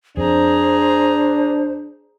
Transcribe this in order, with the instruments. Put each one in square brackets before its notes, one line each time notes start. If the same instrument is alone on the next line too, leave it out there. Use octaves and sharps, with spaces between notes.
[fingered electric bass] F2 [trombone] D4 [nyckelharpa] G#4 A#5 [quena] C5